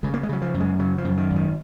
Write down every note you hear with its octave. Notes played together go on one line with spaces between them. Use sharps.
C#3 G#3
A#3
G#3
C#3 F#3
F3
F#2
G#3
C#3 F#3
F3
F#2
D#3
G#1
D#3